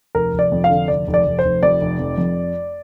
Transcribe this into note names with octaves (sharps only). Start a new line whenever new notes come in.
F1 A#4
F1
D5
F2
F5
D3
F1 D5
F1
D5
F1
C5
F1
F2 D5
F1
F2
F2